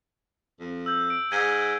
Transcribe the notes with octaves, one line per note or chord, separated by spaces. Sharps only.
F2
E6 G6
D7
G#2 G#6 D#7 G7